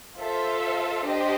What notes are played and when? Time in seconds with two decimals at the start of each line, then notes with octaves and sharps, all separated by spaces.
0.17 F4 A4 C5 E5
1.05 D4 G4 C5 D#5